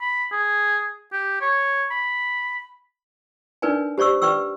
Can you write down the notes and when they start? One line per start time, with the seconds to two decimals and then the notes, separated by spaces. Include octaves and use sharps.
0.01 B5
0.32 G#4
1.12 G4
1.41 C#5
1.91 B5
3.62 D4 D#4 A#4 B4 D5 G#5
3.98 G4 C5 D5 C#6 E6
4.22 B4 D5 G5 C#6 E6